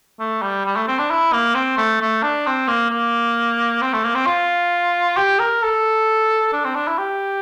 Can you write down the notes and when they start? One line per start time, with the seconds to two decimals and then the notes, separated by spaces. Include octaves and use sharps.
0.19 A3
0.42 G3
0.65 G3
0.76 A3
0.88 C4
0.99 D4
1.11 E4
1.33 A#3
1.55 C4
1.77 A3
2.01 A3
2.23 D4
2.46 C4
2.68 A#3
2.90 A#3
3.82 C4
3.93 A3
4.03 A#3
4.15 C4
4.26 F4
5.17 G4
5.39 A#4
5.62 A4
6.53 D4
6.64 C4
6.75 D4
6.87 E4
6.98 G4